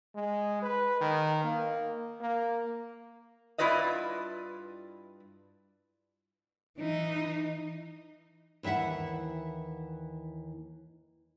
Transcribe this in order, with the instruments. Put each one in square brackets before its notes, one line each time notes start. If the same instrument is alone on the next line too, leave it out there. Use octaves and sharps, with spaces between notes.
[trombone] G#3
B4
D#3
A#3
A#3
[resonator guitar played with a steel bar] G2 E4 F4 B4 D5 D#5
[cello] E3 D#4
[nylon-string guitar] D#2 E3 E4 E5 F#5